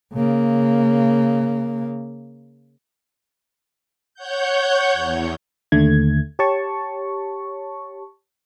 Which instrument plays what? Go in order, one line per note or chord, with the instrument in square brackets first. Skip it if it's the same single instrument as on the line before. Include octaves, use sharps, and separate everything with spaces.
[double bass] C#3 A#3
[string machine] C#5 F#5 G6
E2
[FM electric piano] D#2 D3 A3 G#6
G4 C#5 A5 C#6